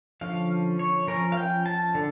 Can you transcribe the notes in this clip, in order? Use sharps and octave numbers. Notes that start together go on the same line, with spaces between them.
D3 F3 C#4 F5
C#5
F3 C#4 A#4
F5
G5
A5
D3